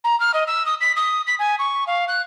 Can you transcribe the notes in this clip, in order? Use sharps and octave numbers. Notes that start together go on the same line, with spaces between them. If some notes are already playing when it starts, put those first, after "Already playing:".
A#5
F6
D#5
E6
D#6
B6
D#6
B6
G#5
C#6
F5
F#6